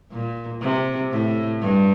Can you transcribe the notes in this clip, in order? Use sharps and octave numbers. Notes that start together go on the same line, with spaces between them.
A#2
C3
A2
G2